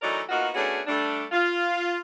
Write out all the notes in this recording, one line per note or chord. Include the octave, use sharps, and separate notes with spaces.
E3 F#3 A3 D#4 A#4 D5
A#3 B3 D#4 F4 F#4
A3 B3 C#4 D4 F#4 G#4
G3 A3 D4
F4